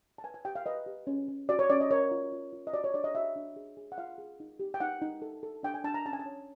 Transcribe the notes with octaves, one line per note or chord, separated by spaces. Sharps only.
A5
B4 G#5
G#5
G4 G5
F5
B4 D#5
G4
C#4
C#4
F#4 D5
C#5
C#4 D5
D#5
A#4 C#5
F4
F4
F4
D#5
F#4 D5
C#5
D4 D5
D#5
F#4 E5
D4
G#4
G#4
F#5
F4 F5
G#4
D#4
G4
G5
D#4 F#5
D#4
A4
A4
D4 G5
G#5
D4 A5
A#5
C#4 A5
G#5
A5
C#5